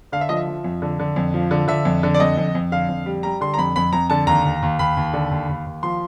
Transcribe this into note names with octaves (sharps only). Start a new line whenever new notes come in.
D3 F5
E5
F3 D#5
E5
F3
F2
D3
D3
F2
F3
D3
D3 E5
F2
D3
D5
F2 D#5
F2
F2
D3 F5
F2
G3
G3 A#5
D3 C6
A#5
F2 B5
F2 B5
F2 A#5
D3 A5
D#2 A#5
D#2
D#2
D#2 B5
D#2
D3
D#2
D#2
D#2
F3 C6